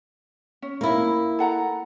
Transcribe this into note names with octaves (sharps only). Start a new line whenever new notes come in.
C#4
A#3 E4
A4 F#5 A#5